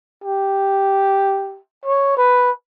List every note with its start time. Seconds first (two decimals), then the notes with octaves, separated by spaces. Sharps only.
0.24 G4
1.85 C#5
2.17 B4